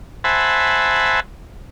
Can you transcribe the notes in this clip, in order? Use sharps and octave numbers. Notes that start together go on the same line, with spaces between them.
C5 E5 F#5 G#5 A5 B5